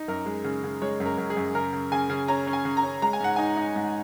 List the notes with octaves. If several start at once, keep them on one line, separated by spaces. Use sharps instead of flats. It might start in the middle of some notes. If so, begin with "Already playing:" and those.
Already playing: D#4
F#2 A#4
G#3
C#3
C#3
G#3 C#5
F#2
A#4
F#2
G#4
F#2
C#3 A#4
C#3
C#3 G#5
C#3
C#4 A#5
C#4
G#5
C#3
A#5
C#4
G#3 A#5
G#5
G#2 F#5
D#4 G#5
D#4
G#2